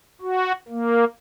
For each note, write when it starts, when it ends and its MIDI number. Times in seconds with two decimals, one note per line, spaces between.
0.22 0.52 66
0.69 1.05 58